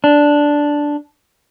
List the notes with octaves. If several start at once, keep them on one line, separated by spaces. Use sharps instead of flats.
D4